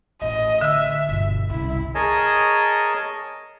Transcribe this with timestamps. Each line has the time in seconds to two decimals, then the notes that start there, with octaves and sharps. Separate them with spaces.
0.22 A1 D#5
0.61 D3 E5 E6
1.09 G1 B2
1.50 C2 C#3 E4
1.95 G#4 A#4 C#5 D#5 G#5 A5